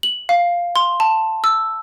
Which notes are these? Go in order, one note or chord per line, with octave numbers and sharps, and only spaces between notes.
F#7
F5
C6
A5
E6